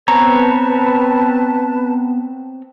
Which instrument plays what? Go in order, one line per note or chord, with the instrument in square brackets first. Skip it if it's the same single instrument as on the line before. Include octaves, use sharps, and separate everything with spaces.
[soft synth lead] B3 [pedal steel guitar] C4 C#5 [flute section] B4 A5 [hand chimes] A#5